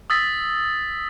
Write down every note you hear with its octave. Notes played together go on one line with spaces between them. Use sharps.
D#6 E6 A6 B6